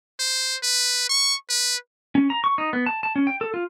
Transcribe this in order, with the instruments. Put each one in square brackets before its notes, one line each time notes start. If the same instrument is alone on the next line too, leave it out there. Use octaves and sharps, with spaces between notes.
[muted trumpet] C5
B4
C#6
B4
[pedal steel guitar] C#4
A#5
C#6
D#4
B3
A5
A5
C#4
G5
A4
F4